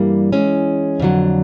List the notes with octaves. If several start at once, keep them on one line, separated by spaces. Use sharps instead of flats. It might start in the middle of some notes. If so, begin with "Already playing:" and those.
Already playing: G2 E3 G3 A#3
E3 G#3 C#4
F2 D3 F#3